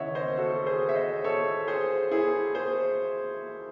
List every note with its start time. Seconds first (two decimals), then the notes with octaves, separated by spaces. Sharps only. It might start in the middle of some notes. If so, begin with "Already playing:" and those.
Already playing: D#2 C#3 E3 C#5 D#5 E5 F#5
0.15 C5 D#5
0.37 F#4 A4
0.66 G#4 C5
0.89 E5
0.95 C5 D#5
1.24 A4 C#5
1.67 G#4 C5
2.11 E4 G#4
2.55 G#4 C5